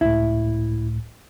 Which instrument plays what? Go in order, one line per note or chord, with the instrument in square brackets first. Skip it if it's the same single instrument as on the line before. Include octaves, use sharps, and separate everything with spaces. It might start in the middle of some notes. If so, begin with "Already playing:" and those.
[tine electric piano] C#2 A2 [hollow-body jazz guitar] E4